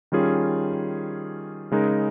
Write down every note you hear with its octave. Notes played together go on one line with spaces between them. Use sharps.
D#3 G3 C#4 F4 G#4
C#3 G#3 D#4 A#4